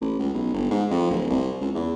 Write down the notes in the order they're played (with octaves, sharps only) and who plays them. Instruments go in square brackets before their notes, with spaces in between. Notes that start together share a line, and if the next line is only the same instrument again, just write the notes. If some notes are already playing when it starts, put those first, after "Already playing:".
[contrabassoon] A1
C#2
B1
G1
G#2
F2
D1
C2
C#2
E2